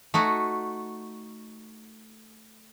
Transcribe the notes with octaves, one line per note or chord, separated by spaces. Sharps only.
A3 D#4 F#4 G#5